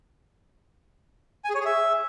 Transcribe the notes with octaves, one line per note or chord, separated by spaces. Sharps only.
G#5
G#4
C#5
G#4
E5